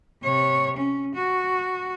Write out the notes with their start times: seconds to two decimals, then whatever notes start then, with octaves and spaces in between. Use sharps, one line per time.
0.22 C3 C#5
0.77 C#4
1.15 F#4